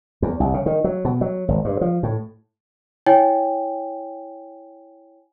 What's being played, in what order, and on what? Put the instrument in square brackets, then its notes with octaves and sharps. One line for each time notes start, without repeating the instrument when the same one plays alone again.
[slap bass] E2
C2
C#3
D#3
F#3
B2
F#3
G#1
G2
F3
A2
[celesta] E4 C#5 G5 G#5